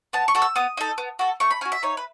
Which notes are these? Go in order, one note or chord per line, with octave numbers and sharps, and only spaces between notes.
B3 A5
C#6
F#4 A4
E6
B3 D#6
D#4 A4
B3
F#4 A4
A3 C#6
B5
C#4 F#4 G#5
E5
D#4 C#5
B4